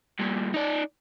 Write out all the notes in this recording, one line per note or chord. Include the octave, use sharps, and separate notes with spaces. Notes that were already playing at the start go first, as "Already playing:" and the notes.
G2 A#2
D#4 D5